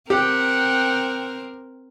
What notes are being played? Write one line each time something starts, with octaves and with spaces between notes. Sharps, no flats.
C4 G4 A#4 F#5 G5